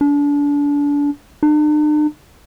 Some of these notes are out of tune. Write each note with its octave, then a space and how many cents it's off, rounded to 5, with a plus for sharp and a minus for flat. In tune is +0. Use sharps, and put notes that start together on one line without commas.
D4 -30
D4 +45